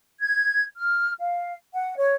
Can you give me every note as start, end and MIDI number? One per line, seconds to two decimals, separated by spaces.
0.20 0.64 92
0.76 1.13 89
1.20 1.54 77
1.74 1.96 78
1.97 2.15 73